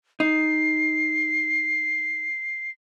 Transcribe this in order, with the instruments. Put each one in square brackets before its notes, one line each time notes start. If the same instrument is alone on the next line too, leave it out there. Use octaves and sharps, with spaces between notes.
[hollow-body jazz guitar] D#4 [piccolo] C7